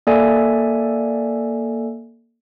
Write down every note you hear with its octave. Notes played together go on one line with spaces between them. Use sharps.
A#3 A4 D5 E5 G#5